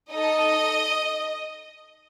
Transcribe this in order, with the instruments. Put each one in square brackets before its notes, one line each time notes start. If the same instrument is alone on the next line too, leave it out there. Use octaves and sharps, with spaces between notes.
[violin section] D#4 A4 D#5